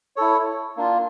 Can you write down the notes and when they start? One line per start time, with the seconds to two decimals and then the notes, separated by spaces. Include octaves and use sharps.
0.16 E4 A4 C#5
0.77 A#3 D4 F4